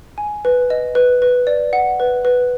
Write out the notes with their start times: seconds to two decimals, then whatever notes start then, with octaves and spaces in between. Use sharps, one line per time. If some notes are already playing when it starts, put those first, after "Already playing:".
0.18 G#5
0.45 B4
0.70 D#5
0.95 B4
1.22 B4
1.47 D5
1.73 F#5
2.00 B4
2.25 B4